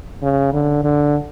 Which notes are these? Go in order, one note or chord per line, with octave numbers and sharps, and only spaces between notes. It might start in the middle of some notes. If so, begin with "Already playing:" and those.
C#3
D3
D3